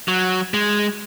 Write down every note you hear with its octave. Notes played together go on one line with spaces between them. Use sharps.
F#3
G#3